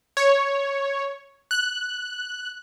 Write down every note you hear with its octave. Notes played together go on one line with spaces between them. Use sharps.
C#5
F#6